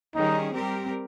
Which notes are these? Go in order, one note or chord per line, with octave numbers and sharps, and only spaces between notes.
D#3 G3 C#4 D#4 G#4
G3 C4 G4 A#4